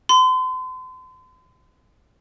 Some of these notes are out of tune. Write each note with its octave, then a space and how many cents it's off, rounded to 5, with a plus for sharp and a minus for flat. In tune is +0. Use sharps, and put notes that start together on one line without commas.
C6 -40